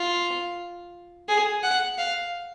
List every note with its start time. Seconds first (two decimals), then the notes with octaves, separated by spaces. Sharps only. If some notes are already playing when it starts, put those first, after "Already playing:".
Already playing: F4
1.29 G#4
1.63 F#5
1.98 F5